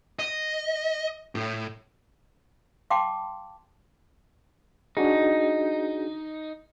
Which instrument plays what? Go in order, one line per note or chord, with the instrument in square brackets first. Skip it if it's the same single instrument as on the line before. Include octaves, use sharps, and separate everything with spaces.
[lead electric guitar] D#5
A2
[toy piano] F5 G5 A5 C6 D6
[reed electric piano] D4 F#4 G#4 [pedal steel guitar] D#4